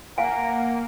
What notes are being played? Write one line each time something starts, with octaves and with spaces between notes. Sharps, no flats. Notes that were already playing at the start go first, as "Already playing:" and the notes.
A#3 F5 F#5 G#5 A#5